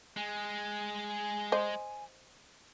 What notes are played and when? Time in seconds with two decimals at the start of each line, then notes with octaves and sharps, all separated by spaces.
0.16 G#3 G#5
1.52 C5 D#5